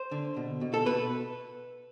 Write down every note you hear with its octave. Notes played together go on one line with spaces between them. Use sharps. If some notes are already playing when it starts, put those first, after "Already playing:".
Already playing: C5
D3
B2
B2
A4
B2 B4